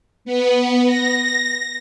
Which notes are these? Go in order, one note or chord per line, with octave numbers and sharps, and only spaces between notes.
B3
A#6